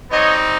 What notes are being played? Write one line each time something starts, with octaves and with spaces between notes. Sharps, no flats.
G3 C4 D#4 C#5 D#5